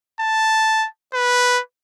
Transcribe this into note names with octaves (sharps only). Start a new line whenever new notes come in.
A5
B4